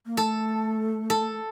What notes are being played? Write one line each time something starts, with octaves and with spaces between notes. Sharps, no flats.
A#3
A3 A4
A4